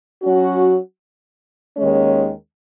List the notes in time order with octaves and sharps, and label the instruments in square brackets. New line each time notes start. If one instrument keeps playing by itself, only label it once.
[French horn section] F#3 C#4 F#4
D#2 D#3 G#3 C#4